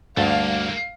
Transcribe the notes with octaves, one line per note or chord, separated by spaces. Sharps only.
D2 G2 A3 A#3 F5 A5